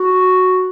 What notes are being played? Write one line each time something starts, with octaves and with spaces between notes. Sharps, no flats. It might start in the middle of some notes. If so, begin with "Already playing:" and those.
Already playing: F#4